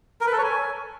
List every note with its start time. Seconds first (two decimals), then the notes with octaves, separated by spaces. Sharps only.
0.21 A#4
0.27 B4
0.32 A4
0.38 C#5
0.44 G#5